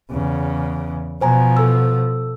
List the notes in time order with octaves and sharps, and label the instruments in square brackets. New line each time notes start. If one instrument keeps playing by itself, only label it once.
[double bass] E2 C#3
[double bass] B2 F3 [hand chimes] C5 G#5 A#5
[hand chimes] A4 E6